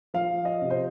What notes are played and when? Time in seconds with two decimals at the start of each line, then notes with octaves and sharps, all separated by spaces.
0.14 F3 F5
0.45 D#5
0.62 C3
0.70 C5